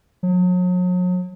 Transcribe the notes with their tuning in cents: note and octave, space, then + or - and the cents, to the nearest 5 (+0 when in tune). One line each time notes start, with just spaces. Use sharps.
F#3 -40